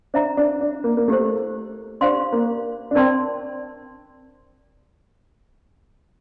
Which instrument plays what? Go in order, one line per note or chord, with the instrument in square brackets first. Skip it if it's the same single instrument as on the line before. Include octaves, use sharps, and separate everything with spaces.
[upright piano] D4 [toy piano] C5 E5 A#5
[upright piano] D4
D4
A#3
A#3
[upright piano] A3 [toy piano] E4 G4 C5
[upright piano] D4 [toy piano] G4 C5 F5 C6
[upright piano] A#3
D4
[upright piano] C4 [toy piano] A#4 D5 A5 C6